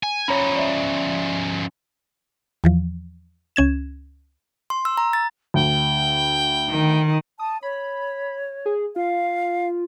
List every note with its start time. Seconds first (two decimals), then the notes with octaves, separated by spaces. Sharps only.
0.03 G#5
0.28 F3 C#4 C#5 A#5 B5
0.56 D5 E5
2.64 E2 E3 F3
3.56 C#2 C#4 G#6 E7
4.70 C6
4.85 E6
4.97 A#5
5.13 A6
5.54 D2 G5
6.70 D#3
7.39 A5 D#6
7.63 C#5 B5
8.66 G#4
8.96 F4 F5